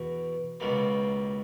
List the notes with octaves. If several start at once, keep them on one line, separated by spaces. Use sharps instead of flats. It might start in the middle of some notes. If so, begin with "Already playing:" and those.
Already playing: E2 B2
C#2 B2 A#3